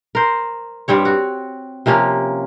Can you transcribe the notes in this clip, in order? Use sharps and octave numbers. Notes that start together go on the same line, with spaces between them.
A#4 C5
G2 G3 C4 C#5
F#4
C3 F3 A#3 C#4